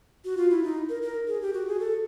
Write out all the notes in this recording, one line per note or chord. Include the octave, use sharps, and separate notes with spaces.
F#4
F4
E4
D#4
A#4
A#4
G#4
G4
F#4
G#4
A4